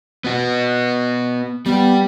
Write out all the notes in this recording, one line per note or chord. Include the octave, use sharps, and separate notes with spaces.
B3 F#4
G3 B3 G4